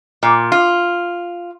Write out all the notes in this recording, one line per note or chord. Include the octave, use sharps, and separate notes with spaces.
A#2
F4